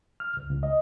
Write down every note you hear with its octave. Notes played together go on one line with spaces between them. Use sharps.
F6
C#2
C#2
D#5